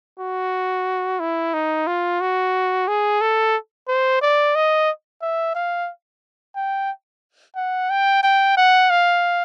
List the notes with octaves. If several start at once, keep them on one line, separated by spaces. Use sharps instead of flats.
F#4
E4
D#4
F4
F#4
G#4
A4
C5
D5
D#5
E5
F5
G5
F#5
G5
G5
F#5
F5